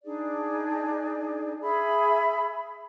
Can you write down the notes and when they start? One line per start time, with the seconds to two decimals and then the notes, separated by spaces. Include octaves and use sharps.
0.04 D4 D#4 G#4 D5
1.61 G#4 E5 B5